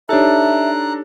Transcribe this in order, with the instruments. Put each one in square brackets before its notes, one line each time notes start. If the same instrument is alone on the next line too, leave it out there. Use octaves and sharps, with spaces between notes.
[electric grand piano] D4 A4 [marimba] D#4 G4 C#5 [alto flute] E5 [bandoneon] A#5 F#6